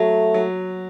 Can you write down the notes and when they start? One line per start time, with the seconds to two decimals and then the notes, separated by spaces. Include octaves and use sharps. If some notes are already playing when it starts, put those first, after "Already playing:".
Already playing: F#3 A3
0.34 F#3